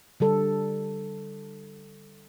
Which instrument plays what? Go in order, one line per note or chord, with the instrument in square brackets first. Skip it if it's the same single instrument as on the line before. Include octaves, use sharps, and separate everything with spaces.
[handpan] D3 G3 A4